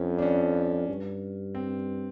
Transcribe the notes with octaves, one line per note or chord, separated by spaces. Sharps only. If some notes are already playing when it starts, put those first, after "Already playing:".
Already playing: F2 C#4
D4
C#4
G2
C4